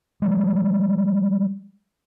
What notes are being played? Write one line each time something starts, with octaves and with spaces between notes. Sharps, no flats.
F3 G3 G#3